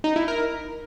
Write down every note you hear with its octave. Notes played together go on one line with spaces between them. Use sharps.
D#4
E4
A#4